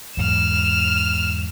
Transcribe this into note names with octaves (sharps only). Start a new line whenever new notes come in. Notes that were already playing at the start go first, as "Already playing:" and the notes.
E2 G#2 F#3 F6 E7